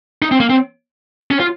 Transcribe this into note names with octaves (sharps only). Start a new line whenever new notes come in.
D#4
C4
A#3
C4
C#4
F4